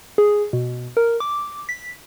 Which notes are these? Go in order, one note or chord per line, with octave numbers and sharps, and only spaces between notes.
G#4
B2
A#4
D6
B6